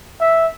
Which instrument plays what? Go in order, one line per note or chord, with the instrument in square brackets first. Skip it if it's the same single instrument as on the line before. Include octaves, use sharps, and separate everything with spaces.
[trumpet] E5